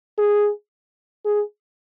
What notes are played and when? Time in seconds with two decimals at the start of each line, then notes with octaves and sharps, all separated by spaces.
0.18 G#4
1.25 G#4